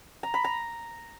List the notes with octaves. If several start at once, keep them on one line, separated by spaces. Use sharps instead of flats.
A#5
B5
A#5